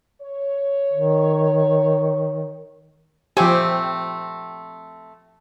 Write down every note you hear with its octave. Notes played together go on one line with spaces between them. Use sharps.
C#5
D#3
F3 A3 C4 G4 G#5